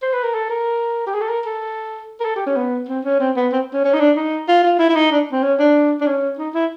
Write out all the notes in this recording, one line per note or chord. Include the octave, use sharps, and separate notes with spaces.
C5
B4
A#4
A4
A#4
G4
G#4
A4
A#4
A4
A#4
A4
G4
C#4
B3
C4
C#4
C4
B3
C4
C#4
C#4
D#4
D4
D#4
F4
F4
E4
E4
D#4
D4
C4
C#4
D4
D4
C#4
D#4
E4